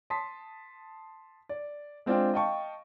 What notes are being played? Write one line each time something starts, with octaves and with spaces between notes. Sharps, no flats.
A5 C6 D#6 B6
D5
G#3 C4 D4 F4 G5
D#5 F5 G5 A5 C#6